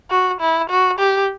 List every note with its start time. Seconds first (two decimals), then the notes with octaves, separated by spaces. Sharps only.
0.10 F#4
0.41 E4
0.70 F#4
0.99 G4